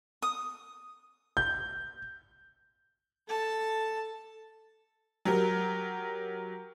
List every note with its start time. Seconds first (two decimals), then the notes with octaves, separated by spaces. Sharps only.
0.22 D#6
1.37 G6
3.27 A4 A5
5.25 F#3 G4 A#4